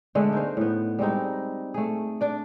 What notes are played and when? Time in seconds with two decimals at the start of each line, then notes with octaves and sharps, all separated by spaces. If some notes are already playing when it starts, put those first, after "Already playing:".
0.15 D3 G#3 A3 B3
0.33 D#4 A#4 C5
0.57 A2 B3
0.99 G3 G#3 C4 D#4
1.74 A3 G#4
2.21 D4 D5